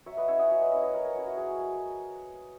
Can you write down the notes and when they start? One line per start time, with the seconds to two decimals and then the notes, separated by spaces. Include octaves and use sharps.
0.06 F#3 C#5 E5
0.17 B4 D#5
0.28 C#4 E4 C#5 E5
0.39 D#5 F#5
0.50 F#3 C#5 E5
0.61 B4 D#5
0.72 C#4 E4 B4 D#5
0.82 B4 D#5
0.94 F#3 A#4 C#5
1.04 A#4 C#5
1.15 C#4 E4 F#4
1.26 F#4
1.37 F#3 G#4